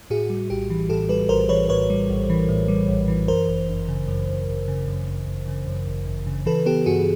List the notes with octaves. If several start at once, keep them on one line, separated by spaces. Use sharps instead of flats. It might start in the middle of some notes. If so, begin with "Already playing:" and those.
A2 F#4 G#4
G3
A#1 G4
E3
A2 G4 A4
G3 A4 B4
A#1 A#4 C5
E3 B4 C#5
A2 B4 C#5
G3
A#1
E3
A2
G3
A#1
E3
F#2 A#4 C5
G1
G1
C#3
F#2
G1
G1
C#3
F#2
G1
G1
C#3
F#2
G1
G1
C#3
E3 A4 B4
B3 G4 A4
G2 F#4 G#4